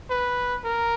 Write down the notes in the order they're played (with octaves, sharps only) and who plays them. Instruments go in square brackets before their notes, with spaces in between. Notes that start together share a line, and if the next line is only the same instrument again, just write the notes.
[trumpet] B4
A#4